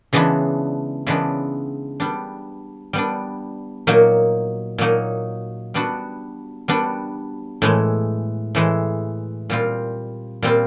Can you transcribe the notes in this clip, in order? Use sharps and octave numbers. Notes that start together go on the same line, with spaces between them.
C#3 E3 G#3 B3 D4
C#3 E3 G#3 B3 D4
G3 B3 D4
G3 B3 D4
A#2 F#3 A#3 D#4
A#2 F#3 A#3 D#4
G3 B3 D4 F#4
G3 B3 D4 F#4
A2 E3 G#3
A2 E3 G#3
A#2 G3 C4 F4
A#2 G3 C4 F4